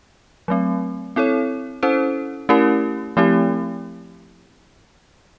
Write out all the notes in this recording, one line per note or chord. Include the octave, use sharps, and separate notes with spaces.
F#3 A3 C4
C4 E4 A4 C#5
C#4 E4 A4 C5
A3 C#4 E4 G4 A#4
F3 A3 C4 E4 G4